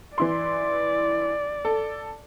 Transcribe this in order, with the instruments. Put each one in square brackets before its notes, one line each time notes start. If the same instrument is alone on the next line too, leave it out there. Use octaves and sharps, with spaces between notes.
[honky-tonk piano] E3 E4 C6 [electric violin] D5
[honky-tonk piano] A4